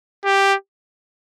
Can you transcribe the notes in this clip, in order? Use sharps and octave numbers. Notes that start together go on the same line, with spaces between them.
G4